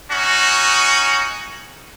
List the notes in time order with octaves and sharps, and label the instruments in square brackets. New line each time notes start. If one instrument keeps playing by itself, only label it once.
[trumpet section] C#4 D#4 F#4